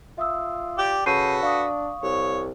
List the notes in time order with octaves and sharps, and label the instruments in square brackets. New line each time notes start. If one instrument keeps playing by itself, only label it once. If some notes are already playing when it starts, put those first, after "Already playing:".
[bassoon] F4 [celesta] E5 D#6 E6
[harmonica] G4 D5
[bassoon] C#3 [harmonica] F#4 A4 B4 [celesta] G6 C7 D#7
[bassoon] D4 [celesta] F5 C#6 D#6
[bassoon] C2 [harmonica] C#5